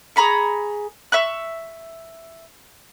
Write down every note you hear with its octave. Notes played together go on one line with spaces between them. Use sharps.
G#4 A#5 B5 C#6
E5 C#6 F#6